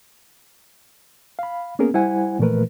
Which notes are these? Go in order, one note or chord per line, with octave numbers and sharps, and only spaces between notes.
F5 B5
A#3 B3 C#4 G#4 A#4
G3 E4 C5 F#5 G#5
A#2 E3 F3 A3 A#4 B4